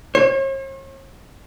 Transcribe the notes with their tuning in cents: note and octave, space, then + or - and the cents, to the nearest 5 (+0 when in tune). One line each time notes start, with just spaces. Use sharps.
C#5 -45